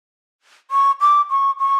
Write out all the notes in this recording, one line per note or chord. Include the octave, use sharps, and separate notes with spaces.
C#6
D6
C#6
C#6